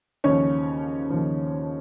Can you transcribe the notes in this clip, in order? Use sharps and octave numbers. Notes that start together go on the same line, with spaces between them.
D#2 C#3 F3 C#4 C#5
D#2 C#3 F3